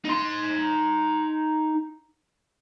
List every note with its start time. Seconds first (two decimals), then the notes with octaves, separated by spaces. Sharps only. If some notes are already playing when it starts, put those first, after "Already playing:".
0.05 D#4 C6